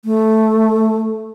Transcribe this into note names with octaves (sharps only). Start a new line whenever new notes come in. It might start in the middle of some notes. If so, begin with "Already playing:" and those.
A3